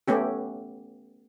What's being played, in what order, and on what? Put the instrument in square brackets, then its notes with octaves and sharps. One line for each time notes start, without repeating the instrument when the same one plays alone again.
[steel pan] A3 B3 C#4 G4